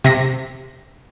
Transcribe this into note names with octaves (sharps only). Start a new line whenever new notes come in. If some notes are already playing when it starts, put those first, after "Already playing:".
C3 A#6 B6